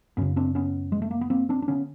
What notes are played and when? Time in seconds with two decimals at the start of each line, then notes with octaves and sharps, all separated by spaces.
0.17 F#2 C#3 B3 C#4
0.36 C4 D4
0.55 B3 C#4
0.92 G#3
1.02 A3
1.11 A#3
1.21 B3
1.30 A#3 C4
1.49 C4 D4
1.62 D4
1.68 D3 B3 C#4